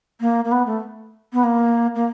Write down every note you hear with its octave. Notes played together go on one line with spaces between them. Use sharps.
A#3
A#3
B3
A3
B3
A#3
A#3